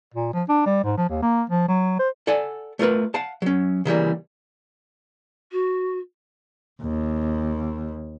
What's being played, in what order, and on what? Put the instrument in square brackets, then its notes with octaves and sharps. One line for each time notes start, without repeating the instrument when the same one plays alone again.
[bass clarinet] A#2
F3
D4
G3
G#2
F3
D#2
A#3
F3
F#3
C5
[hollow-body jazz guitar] A4 D5 F#5 G#5
A3 F4 A#4 B4
F5 F#5 A5
F#3 C#4
C#3 E3 G3 A#3
[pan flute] F#4
[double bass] D#2